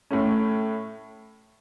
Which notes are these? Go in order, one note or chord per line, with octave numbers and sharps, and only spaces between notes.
A2 A3 C#4